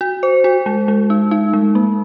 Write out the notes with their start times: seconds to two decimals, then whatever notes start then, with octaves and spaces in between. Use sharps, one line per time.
0.01 F#4
0.23 C5
0.44 F#4
0.66 G#3
0.88 G#3
1.10 D#4
1.31 D#4
1.53 G#3
1.75 A#3